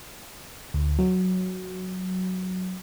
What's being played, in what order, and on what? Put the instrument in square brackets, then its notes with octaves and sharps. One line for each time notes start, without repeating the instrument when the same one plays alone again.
[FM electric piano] D2
F#3